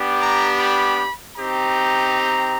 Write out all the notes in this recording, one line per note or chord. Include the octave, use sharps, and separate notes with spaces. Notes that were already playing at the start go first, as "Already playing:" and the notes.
Already playing: B3 D4 G4
A#5
B5
C4 D#4 G4 A#5